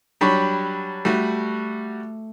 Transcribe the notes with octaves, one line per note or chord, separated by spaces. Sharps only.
F#3 G3 D4 G5 B5 C#6
G3 A3 F#4